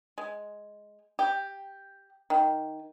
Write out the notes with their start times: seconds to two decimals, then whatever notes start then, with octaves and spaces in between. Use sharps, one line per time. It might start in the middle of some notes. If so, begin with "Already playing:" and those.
0.18 G#3
1.19 G4
2.30 D#3